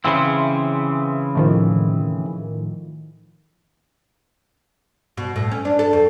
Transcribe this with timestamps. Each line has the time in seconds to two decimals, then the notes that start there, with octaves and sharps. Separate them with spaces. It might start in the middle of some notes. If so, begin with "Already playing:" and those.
0.04 C#3 E3 C4 E5 C6
1.35 A2 D#3 F3
5.17 B2
5.36 A2
5.51 C#4
5.65 D4
5.79 A4
5.93 F2